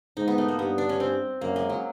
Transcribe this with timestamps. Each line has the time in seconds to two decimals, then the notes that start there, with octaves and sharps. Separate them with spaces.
0.17 G#2 D#4
0.28 B3
0.38 A3
0.48 A#3
0.59 G2 B3
0.78 D4
0.89 C#4
1.00 C4
1.41 F#2 A#3
1.56 G#3
1.70 F#3